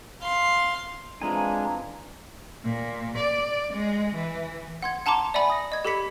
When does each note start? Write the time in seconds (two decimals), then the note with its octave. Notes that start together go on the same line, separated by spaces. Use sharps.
0.22 F5 C6
1.21 F2 E3 F3 G#3 D4 G#5 A#5
2.64 A#2
3.17 D5
3.73 G#3
4.15 E3
4.82 F#5 C6 G#6
5.06 F#5 A5 A#5 C6 D6
5.34 D5 E5 F#5 G#5 B5
5.50 D#6 A#6
5.72 D#5 G#6
5.85 G4 A4 B5 B6 C#7